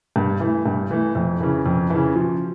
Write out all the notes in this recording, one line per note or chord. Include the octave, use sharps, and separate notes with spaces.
G2
E3 A3
G2
E3 A3
F2
C#3 E3
F2
C#3 E3
F3